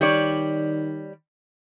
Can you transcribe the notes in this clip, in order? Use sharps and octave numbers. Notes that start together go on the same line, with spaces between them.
D#3 G3 C#5 D5